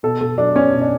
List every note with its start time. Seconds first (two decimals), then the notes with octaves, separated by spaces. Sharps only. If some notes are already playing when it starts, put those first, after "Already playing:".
0.03 B2 A4
0.21 B2 A4
0.38 F#3 D4
0.56 B3 C#4
0.73 B2
0.82 D4